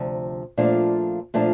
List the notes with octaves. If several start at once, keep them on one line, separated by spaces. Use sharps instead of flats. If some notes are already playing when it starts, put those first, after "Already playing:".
Already playing: D2 C3 F3
A#2 F3 A3 D4 F4
A#2 F3 A3 D4 F4